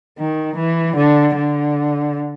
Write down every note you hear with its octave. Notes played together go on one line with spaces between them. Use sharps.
D#3
E3
D3
D3